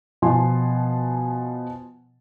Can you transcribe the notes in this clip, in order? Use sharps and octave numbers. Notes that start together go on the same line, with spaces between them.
B2 F3 G#5 C6